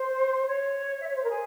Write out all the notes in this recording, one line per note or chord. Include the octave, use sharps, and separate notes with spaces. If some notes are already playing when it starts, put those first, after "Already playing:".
Already playing: C5
C#5
E5
C#5
C5
A#4
G#4